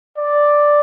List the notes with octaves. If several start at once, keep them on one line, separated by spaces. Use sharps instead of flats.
D5